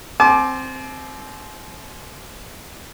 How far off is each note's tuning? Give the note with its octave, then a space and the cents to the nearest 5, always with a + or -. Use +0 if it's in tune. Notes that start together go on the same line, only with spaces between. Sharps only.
C4 +0 A5 -45 D6 +10